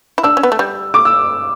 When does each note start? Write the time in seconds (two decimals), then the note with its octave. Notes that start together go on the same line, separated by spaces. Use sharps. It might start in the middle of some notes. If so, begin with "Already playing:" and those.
0.18 E4
0.23 D4 E6
0.37 C#4
0.43 B3
0.52 A3
0.59 G3
0.94 D6
1.05 E6